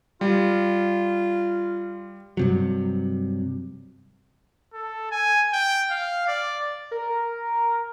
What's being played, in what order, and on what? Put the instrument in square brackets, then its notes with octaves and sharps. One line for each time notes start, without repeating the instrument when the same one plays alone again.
[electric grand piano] G3 [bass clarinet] F4
[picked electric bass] G2 C3 F#3
[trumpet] A4
G#5
G5
F5
D5
[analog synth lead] A#4